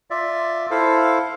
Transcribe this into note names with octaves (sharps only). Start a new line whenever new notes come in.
F4 D5 E5
E4 A4 C5 F5